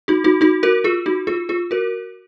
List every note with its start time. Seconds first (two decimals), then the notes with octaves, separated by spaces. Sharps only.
0.08 D#4 F#4
0.24 D#4 F#4
0.41 D#4 F#4
0.63 F#4 A#4
0.84 F4 G#4
1.06 D#4 F#4
1.27 F4 G#4
1.49 F4 G#4
1.71 F#4 A#4